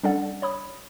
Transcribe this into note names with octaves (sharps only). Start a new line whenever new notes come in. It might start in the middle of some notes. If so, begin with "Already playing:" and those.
G3 C#4 D4 A4 D5 F#5
C#5 B5 D#6